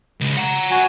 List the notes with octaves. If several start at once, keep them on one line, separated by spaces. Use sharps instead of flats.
C#2
F#5 A#5
F#4 G#5